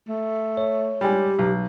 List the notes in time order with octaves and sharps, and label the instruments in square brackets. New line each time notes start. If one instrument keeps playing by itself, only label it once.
[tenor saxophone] A3
[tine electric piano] C#5
[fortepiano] G3 G#3 [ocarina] G4
[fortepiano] B1